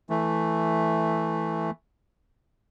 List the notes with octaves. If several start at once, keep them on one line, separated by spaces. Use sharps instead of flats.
E3 A3